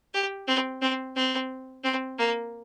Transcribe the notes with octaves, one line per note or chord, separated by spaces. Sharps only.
G4
C4
C4
C4
C4
A#3